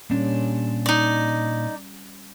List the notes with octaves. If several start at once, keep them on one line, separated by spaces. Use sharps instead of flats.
A#2 G3 C#4 D4
D#4 D5